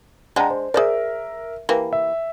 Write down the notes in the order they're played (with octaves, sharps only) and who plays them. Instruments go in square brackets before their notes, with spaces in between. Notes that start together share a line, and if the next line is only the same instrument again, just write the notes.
[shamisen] G#3 D4 [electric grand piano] F#5 G5 A#5
[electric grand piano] C5
[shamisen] G#4 C5 D5 [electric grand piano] A#4 E5
[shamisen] E3 A#3 G4
[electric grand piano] E5